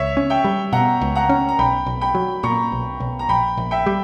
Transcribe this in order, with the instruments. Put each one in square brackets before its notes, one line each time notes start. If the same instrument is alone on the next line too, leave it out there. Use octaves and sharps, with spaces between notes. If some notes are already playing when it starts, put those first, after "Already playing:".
Already playing: [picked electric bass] C#2 [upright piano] C#5 E5
[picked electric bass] C#4
[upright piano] E5 G5
[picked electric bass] G3
[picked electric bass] B2 [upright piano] F#5 A#5
[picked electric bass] C#2
[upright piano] F#5 A#5
[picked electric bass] C#4
[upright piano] A#5
[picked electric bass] B1 [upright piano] G5 B5
[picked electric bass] B1
[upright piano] G5 B5
[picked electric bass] F#3
[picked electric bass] A#2 [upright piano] A#5 C#6
[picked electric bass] B1
B1
[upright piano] A#5
[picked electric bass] A#1 [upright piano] G5 B5
[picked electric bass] A#1
[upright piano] E5 G5
[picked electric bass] G3